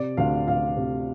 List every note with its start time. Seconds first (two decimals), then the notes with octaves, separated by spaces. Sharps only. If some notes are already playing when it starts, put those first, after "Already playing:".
Already playing: C3 D5
0.17 D2 F5
0.48 D2 F5
0.76 C3